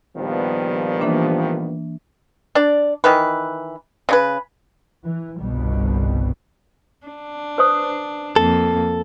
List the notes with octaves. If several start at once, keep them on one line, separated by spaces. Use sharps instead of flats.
A#1 D#3 F3 G3 B3
E3 A#3 D4
D4 D5
D#3 E3 B4
C#3 D#4 B4
E3
G1 C2 B2 G3
D4
B4 C5 D#6
F2 A#3 A4